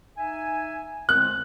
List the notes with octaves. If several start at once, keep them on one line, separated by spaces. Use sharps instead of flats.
D#4 E5 G#5
D3 G#3 C4 F#6